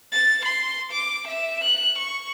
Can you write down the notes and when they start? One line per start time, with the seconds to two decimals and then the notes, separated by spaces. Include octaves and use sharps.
0.12 A6
0.45 C6
0.92 D6
1.28 E5
1.64 F#6
1.98 C#6